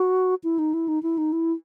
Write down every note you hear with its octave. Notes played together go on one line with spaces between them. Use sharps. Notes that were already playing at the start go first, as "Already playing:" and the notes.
Already playing: F#4
E4
D#4
E4
D#4
E4
D#4
E4